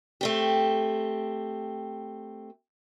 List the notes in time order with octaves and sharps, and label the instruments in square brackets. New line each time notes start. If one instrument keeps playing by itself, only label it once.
[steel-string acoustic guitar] A3 C4 G4